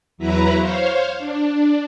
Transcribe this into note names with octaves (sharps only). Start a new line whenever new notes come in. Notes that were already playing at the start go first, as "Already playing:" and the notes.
E2 F#3 E4 B4 A#5 B5
C5 C#5 F5
D4